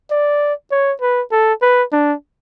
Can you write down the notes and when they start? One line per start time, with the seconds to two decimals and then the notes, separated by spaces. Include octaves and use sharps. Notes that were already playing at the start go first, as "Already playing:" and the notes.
0.11 D5
0.71 C#5
1.01 B4
1.32 A4
1.62 B4
1.92 D4